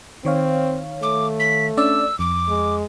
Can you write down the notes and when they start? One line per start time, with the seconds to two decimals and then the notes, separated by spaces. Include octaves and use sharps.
0.25 D#3 C4 C#5 F5
1.03 A3 D6
1.40 B6
1.77 C#4 D4 D5 E6
2.19 F2 D6
2.49 G#3